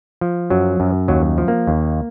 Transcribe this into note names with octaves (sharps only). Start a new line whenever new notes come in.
F3
F#2 F#3
F#2
D#2 F#3
F3
A#3
D#2